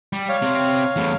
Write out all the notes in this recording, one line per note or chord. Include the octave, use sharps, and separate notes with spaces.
G3
C#5 F5
C3 C4
E2 A2